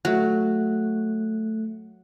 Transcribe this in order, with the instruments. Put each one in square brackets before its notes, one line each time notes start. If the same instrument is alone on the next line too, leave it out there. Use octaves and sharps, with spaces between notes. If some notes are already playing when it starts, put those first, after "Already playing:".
[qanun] F#3 [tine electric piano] A3 F#6